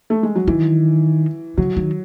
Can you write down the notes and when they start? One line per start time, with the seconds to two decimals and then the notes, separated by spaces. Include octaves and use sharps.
0.10 A3
0.23 G#3
0.35 F#3
0.48 D#3 E3
1.57 C#3 F#3
1.77 D#3